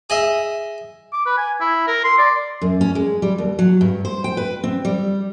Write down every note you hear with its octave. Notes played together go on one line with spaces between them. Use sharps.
G#4 D#5 E5
D6
B4
G#5
E4
A#4
C6
D5
F#2
C#4
G#3
G3
D#2
F#3
G2
C5
G5
B4
C4
G3